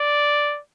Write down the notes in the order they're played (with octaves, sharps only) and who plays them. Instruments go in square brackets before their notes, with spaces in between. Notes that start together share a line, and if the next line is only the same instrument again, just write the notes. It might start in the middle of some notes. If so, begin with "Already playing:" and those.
Already playing: [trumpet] D5